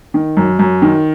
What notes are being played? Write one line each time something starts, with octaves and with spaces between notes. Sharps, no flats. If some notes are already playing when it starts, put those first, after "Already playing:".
D#3
F#2
F#2
D#3